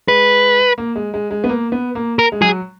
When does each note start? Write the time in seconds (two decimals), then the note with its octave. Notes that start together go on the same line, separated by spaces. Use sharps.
0.08 G#3 B4
0.78 A#3
0.96 G#3
1.14 G#3
1.31 G#3
1.44 B3
1.49 A#3
1.72 B3
1.95 A#3
2.19 A#4
2.32 G#3
2.42 F#3 G#4